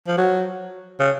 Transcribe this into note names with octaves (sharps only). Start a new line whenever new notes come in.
F3
F#3
C#3